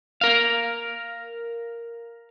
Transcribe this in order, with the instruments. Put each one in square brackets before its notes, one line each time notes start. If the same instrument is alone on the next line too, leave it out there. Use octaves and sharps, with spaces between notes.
[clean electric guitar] A#4 F5